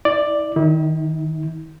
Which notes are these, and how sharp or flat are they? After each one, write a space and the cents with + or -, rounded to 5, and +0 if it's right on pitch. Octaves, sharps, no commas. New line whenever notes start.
E4 -35 D5 +5
D#3 +0 E4 -40